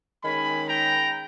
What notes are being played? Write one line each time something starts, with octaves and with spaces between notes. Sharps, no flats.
D#3 G#3 C#4 G#5 B5
G5 A#5